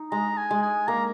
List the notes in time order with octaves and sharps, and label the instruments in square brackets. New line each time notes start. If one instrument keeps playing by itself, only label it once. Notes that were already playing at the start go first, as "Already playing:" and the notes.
Already playing: [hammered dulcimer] D#4
[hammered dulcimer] G#3 [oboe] A#5
[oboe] G#5
[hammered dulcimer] G#3
[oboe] G#5
[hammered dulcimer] A#3 [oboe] A#5